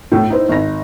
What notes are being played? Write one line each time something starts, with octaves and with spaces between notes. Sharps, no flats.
A2
D#4 E4 C5
G#1 A#6